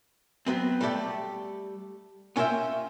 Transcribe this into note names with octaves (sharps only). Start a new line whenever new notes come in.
F#3 B3 C4
G3 A3 G4 A4 D5
B3 C#4 F4 A#4 E5 G5